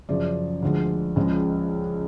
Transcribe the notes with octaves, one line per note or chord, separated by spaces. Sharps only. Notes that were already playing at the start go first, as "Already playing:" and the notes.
F#2 C#3 F3 D5
D2 D3 F3 G#3
C#2 C#3 F3 G#3